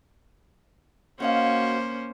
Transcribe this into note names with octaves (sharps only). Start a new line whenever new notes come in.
A#3 C#4 F#4 C5 D#5 F5